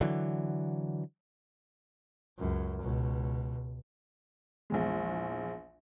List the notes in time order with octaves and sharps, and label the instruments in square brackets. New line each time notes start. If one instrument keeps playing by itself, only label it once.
[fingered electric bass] D3 E3 F#3
[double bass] C#2 F#2
C#2 B2
[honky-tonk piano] A#1 E2 G#3